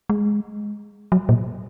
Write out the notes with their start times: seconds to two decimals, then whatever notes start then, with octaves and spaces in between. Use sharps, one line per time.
0.10 G#3
1.12 F#3
1.29 A#2